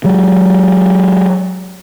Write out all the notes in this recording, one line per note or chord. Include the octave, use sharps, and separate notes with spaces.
F#3 G#3